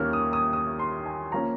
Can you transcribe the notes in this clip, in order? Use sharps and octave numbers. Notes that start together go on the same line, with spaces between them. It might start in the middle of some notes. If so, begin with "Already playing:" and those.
Already playing: D#2 D#3 A#3 C#4 F6
D#6
D#6
D#6
C6
G#5
F3 A#3 C#4 A#5